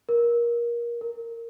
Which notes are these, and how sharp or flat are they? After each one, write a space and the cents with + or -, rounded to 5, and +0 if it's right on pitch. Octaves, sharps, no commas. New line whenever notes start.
A#4 +20
A#4 -15